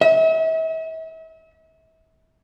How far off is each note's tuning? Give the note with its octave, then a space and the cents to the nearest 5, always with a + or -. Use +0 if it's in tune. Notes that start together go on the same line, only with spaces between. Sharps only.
E5 -40